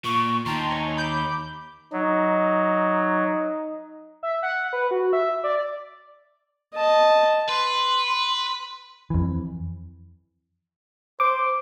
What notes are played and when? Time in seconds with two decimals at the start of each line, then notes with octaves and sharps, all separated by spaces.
0.04 A#2 C#6
0.46 D#2 D#4 G5 A5 A#5 C6
0.70 C#5 G#5 C#6
0.97 B5 D6 G6
1.93 F#3 D#4
4.23 E5
4.43 F#5
4.73 B4
4.91 F#4
5.13 E5
5.44 D5
6.74 D#5 A5
7.48 B4 C6
9.10 F2 E3
11.20 C5 D6